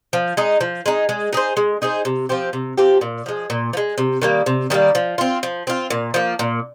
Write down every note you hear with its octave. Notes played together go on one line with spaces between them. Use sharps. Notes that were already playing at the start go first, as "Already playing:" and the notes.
F3
G#3 D#4
F3
G#3 D#4
G#3
D#4 G#4 C5
G#3
D#4 G#4 C5
C3
F3 C4 G4
C3
F3 C4 G4
A#2
F3 G#3
A#2
F3
G#3
C3
D#3 G3 A#3
C3
D#3 G3 A#3
F3
C4 F4
F3
C4 F4
A#2
F3 A#3
A#2